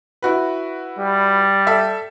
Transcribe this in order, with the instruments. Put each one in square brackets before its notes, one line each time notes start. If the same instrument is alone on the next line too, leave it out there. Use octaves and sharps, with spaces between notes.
[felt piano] E4 F#4 B4
[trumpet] G3
[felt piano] A4 E5